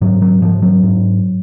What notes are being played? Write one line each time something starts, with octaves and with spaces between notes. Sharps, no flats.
G#2 F#3
F#3
G#2 F3
F#3
G#2